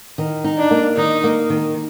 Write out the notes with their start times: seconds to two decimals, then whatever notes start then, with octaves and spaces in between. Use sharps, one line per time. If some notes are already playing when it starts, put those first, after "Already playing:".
0.18 D#3
0.44 D#4
0.58 D4
0.71 A#3
0.97 D#3 D#4
1.24 A#3
1.50 D#3